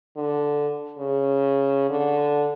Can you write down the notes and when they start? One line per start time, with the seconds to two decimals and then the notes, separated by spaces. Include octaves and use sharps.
0.17 D3
0.98 C#3
1.90 D3